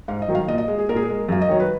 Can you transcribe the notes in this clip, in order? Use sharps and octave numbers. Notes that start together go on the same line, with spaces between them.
G#2 F5
D#5
D#3 F#3
F5
A#2 D#5
D#5
G#3
G#4
A#2 A#4
G#4
A#4
G#3
F#2 F5
D#5
D#3 F#3 C#5
B4